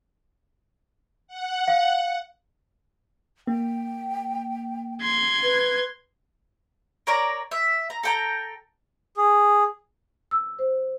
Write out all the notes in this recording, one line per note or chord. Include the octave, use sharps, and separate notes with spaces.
F#5
F5
A#3 G5
C6 G#6
B4
A#4 C#5 D5 A#5
E5
A#5
A4 G5 A#5
G#4
E6
C5